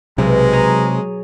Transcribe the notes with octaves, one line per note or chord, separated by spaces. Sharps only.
B1 C3 G#3
G#4 C#5 A#5